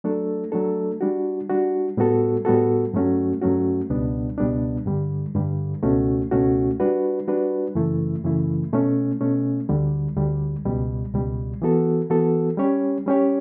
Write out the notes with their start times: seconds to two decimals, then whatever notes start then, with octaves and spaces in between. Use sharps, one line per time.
0.04 F#3 A3 D4 A4
0.52 F#3 A3 D4 A4
1.01 G3 D4 F#4
1.49 G3 D4 F#4
1.97 A2 G3 B3 F#4 A4
2.45 A2 G3 B3 F#4 A4
2.94 G2 F#3 A3 C#4 F#4
3.41 G2 F#3 A3 C#4 F#4
3.90 C#2 B2 G3 B3 D4
4.38 C#2 B2 G3 B3 D4
4.86 G2 D3 G3
5.35 G2 D3 G3
5.83 C#2 B2 A3 C#4 F#4
6.31 C#2 B2 A3 C#4 F#4
6.80 G3 D4 F#4 B4
7.28 G3 D4 F#4 B4
7.75 F#2 C#3 E3 A3 E4
8.24 F#2 C#3 E3 A3 E4
8.73 B2 A3 C#4
9.21 B2 A3 C#4
9.69 D2 D3 G3
10.17 D2 D3 G3
10.65 C#2 B2 G3
11.14 C#2 B2 G3
11.62 E3 B3 F#4 A4
12.10 E3 B3 F#4 A4
12.58 G3 C#4 G4 C#5
13.06 G3 C#4 G4 C#5